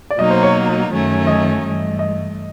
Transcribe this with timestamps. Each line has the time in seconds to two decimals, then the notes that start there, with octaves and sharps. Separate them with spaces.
0.10 D5
0.18 B2 F#3 A#3 D#4 D#5
0.31 C5
0.43 C#5
0.91 F#2 D#3 F#3 A3 C#4
1.27 D#5
1.63 G2 E3 A3
1.99 D#5